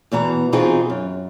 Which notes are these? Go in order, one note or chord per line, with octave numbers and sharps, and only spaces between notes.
E2 B2 E3 A#5
B2 E3 C4 D#4 F4 G#4
F#2